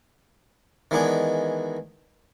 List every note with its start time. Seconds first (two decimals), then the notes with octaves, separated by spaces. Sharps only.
0.91 D#3 E3 G#3 B3 D4 G#4